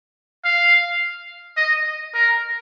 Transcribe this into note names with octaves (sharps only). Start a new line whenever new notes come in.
F5
D#5
A#4